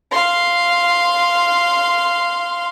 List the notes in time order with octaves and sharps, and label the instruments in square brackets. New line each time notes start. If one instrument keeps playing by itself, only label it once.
[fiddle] F5 C6